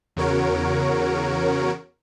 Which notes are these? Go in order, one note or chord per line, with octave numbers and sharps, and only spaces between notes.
E2 C#3 F#4 A#4 C#5 D7